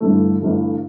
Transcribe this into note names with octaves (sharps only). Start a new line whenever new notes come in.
G1 G2 E3 A3
G1 G2 E3 A3